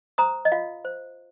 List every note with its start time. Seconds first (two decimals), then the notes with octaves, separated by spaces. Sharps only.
0.18 C5 A#5 D#6
0.45 D#5
0.52 F4 F5
0.85 C5